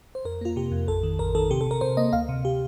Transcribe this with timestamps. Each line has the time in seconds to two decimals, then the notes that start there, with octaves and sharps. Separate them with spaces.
0.15 C5
0.25 F2 A#4
0.41 A#3 F4
0.56 C3 G4
0.72 F2
0.88 A1 A4
1.03 D#3
1.19 A1 A#4
1.35 D#3 A4
1.50 C3 G4
1.61 A4
1.67 C3 A#4
1.81 C3 C5
1.97 A#3 D#5
2.13 D2 F5
2.29 C3
2.45 G4